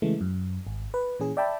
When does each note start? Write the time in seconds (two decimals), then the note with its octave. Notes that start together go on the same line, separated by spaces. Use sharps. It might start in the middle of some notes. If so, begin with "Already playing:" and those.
0.02 C#3 E3 G#3 A3
0.21 F#2
0.67 G#1
0.94 B4
1.19 A#2 E3 C#4 G#4
1.37 D5 E5 G5 A5 B5